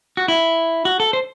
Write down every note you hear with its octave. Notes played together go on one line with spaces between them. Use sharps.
F#4
E4
F#4
A4
C5